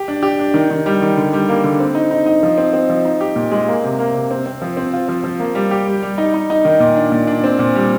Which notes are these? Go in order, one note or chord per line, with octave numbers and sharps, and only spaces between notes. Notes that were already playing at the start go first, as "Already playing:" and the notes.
Already playing: G4
D4
G4
D4
D#3
D#3
G3
D#3
D3
G3
A#3
D3
C4
D#4
D#4
D#4
F3
C4
C4
F3
D#4
G4
A#2
G#3
A#3
C3
A#3
C3
C4
C4
F3
C4
F4
F3
F3
A#3
G3
G4
G3
G3
D#4
D#4
D#4
D#3
A#2
D4
A#2
D4
C4
A#2
G3